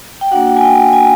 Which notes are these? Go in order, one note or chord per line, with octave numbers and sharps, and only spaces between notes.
G5
A#3 D4 F#4 F#5
G5
G#5
G5
G#5